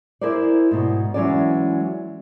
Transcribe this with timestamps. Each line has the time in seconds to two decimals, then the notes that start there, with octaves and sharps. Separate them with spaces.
0.21 E4 G#4 A#4 C5 D5
0.71 G#2 B2
1.14 E3 F#3 G#3 C#4 D5